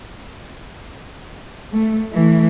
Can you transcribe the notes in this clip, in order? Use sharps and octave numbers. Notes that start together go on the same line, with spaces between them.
A3
E3 A3